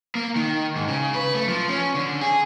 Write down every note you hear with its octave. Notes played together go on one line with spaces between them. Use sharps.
A#3
D#3
G#2
C#3
B4
A3
F3
C#4
D3
G#4